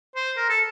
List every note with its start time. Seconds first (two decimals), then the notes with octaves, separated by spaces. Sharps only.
0.16 C5
0.37 A#4
0.49 A4